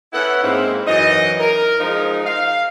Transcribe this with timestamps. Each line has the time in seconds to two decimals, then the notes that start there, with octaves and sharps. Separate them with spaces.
0.13 B3 C#4 E4 A4 F#5
0.43 G#2 A#3 C4 D#4 E4 F5
0.87 F#2 E3 D#4 D#5
1.40 A#4
1.80 F3 G#3 D#4 A#4
2.25 F5